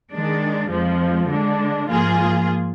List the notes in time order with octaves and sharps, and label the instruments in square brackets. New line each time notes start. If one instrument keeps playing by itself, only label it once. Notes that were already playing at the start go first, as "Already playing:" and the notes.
[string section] D#3 G#3 D4
F2 F3 G#3
D3 G#3 D4
G#2 F3 A#3 F4 G#4